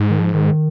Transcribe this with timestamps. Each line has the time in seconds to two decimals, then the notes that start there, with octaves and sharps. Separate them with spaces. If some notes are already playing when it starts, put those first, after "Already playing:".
Already playing: G#2
0.10 D#3
0.20 F3
0.34 D#3